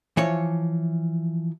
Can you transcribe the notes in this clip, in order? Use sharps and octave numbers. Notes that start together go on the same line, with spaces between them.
E3 F3 C#5